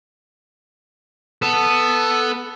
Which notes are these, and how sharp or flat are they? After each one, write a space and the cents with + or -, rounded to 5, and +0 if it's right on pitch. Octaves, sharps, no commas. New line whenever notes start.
B3 +0 A4 +0